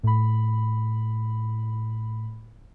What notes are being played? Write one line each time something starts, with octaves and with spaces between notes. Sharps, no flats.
A2 B5